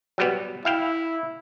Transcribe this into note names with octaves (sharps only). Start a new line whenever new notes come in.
F#3 G3 B3
E4 E5 F5 G5